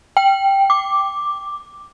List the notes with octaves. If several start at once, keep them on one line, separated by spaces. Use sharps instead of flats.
G5
D6